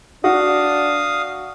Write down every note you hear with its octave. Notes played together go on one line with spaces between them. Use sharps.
D4 F#4 F5 D#6